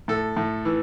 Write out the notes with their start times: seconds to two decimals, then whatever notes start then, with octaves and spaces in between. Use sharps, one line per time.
0.08 A2 A4
0.37 A2
0.65 E3